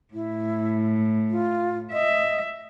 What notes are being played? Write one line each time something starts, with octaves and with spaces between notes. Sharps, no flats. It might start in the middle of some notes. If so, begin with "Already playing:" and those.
A2 E4
F4
D#5 E5